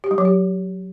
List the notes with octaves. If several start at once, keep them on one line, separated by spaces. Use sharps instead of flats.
G4
G3
F#3
G4